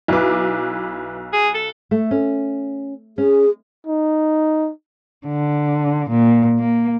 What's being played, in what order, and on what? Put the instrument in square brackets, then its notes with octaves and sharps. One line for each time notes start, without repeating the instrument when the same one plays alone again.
[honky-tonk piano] B1 D6 [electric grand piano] E4 B4
[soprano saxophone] G#4
A4
[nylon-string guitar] A3
C#4
[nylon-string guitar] C#4 [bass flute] G#4
[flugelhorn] D#4
[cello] D3
A#2
A#3